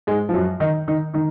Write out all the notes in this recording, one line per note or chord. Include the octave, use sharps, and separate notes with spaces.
G#2 G#3
F3
F#2 F#3
D#3 D#4
D#3 D#4
D#3 D#4